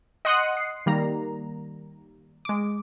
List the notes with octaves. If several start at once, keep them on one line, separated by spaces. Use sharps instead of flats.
D#5 F#5 C6 D#6 F#6 C#7
C7
D#3 G3 A#3 A#5
G#3 D6